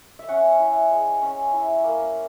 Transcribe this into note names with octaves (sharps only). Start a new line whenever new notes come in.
E5
C#4 F#5
E4
G#3
C#4
E4
A#3